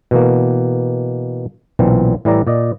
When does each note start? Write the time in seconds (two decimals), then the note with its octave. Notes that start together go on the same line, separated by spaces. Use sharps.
0.11 B2 E3 A#3
1.79 B1 A#2 E3 C4
2.25 A2 E3 G3 E4 D5 A#5
2.47 A#2 D5 D#5